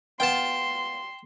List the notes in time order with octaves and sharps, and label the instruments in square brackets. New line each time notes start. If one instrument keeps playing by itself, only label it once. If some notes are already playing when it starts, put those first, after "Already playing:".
[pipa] B3 F4 [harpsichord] G5 A5 [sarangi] C6